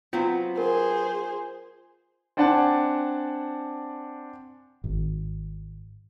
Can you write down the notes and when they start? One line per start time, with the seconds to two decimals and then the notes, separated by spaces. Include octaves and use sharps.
0.13 F#3 B3 C4 F4
0.58 G#4 A#4 C5
2.37 C4 D4 D5 F#5 G#5 A5
4.84 G#1